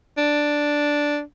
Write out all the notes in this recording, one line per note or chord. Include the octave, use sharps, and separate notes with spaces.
D4